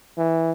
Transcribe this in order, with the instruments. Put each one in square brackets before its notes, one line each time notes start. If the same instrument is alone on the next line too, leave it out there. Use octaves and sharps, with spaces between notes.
[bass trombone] E3